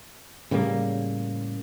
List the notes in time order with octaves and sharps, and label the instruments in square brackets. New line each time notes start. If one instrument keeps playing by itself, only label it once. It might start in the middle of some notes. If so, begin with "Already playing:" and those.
[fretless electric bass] A2 C#3 G3 A#3